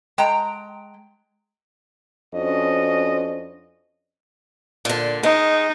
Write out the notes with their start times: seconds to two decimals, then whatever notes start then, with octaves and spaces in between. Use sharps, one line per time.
0.18 G#3 G5 A#5
2.34 F2 C#4 D4 F#4 C5 D#5
4.85 A#2 D3
5.23 G#3 D#4